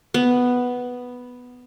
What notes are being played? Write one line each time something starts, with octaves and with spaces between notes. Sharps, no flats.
B3